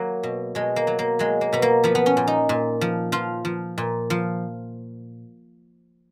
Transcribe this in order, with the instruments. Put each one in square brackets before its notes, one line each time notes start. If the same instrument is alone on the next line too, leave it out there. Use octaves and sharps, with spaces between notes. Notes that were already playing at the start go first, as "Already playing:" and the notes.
Already playing: [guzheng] F#3 A#3
B2
B2 G#3
A#3
F#3
A#3
F#3 G#3
A#3
B2 B3
A#3
F3 B3
B3
C#4
A#2
D#4
A#2
F3
F3 F4
F3
A#2
F3